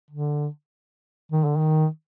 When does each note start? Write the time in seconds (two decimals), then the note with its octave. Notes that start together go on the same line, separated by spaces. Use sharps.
0.11 D3
1.32 D#3
1.45 D3
1.58 D#3